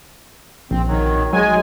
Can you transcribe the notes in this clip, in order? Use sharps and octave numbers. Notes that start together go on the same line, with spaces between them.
A#1 C4
D#3 F#3
F#3 G#3 G#5